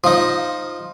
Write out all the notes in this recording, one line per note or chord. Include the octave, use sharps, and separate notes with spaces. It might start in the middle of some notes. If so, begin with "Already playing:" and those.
F3 D#4